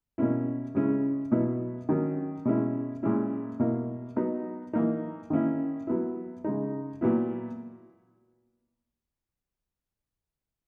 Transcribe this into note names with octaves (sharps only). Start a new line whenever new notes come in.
B2 A#3 C#4 E4
C#3 G#3 C#4 E4
B2 F#3 B3 E4
D#3 F#3 C#4
B2 G#3 C#4 E4
A#2 G#3 C#4 E4
B2 A#3 E4
F#3 B3 D#4
E3 A#3 D#4
D#3 A#3 C#4 E4
F#3 B3 E4
C#3 G#3 D#4
A#2 F#3 B3 E4